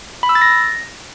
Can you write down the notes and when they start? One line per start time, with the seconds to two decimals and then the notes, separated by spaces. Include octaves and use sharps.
0.23 B5
0.29 E6
0.35 A6
0.42 A#6